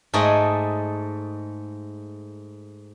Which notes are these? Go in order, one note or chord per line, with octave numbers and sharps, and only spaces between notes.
G#2 A3 G#4 D5 D#5 G#5